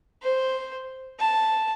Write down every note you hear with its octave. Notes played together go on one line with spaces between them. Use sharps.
C5
A5